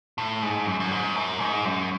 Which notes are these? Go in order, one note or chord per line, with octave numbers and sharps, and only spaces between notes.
A2
G#2
F#2
F#2
G#2
F#2
G#2
F#2